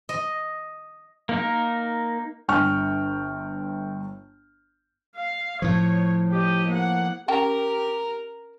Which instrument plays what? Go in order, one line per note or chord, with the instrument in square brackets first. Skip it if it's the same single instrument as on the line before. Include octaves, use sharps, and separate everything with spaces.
[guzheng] D#5
[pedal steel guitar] A#3 D#4 A#4
[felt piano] G1 D3 G5 C#6 F6
[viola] F5
[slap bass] A2 F3 [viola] C#5
[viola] G4 D#5
A#3 F#5
[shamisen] C#4 G5 A5 [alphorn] G4 [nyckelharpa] A#4 A#5